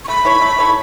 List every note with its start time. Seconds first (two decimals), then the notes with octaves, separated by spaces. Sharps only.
0.04 C#6
0.08 A3 B5
0.25 E4 A4 C#5
0.41 A3
0.58 E4 A4 C#5